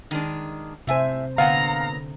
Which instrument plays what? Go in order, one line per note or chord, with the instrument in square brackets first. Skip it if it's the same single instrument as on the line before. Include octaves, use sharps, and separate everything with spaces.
[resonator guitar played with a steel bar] D#3 G#3 D4
[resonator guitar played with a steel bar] A2 E5 G#5 [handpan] C3 C5
[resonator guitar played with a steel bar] A#2 B3 [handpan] D3 [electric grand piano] F5 F#5 [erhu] A#5